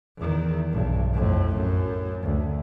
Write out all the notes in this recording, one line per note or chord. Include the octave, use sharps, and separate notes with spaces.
E2 D#3
B1 G2
F2 A2
F#2
D2